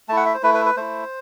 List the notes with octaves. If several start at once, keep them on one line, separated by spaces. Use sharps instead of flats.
A3 E4 F#5 A5
E5
C5
A3 E4 B4
B4
B4
A3 E4 C5